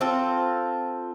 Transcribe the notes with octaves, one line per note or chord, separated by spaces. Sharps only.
C4 F4 A4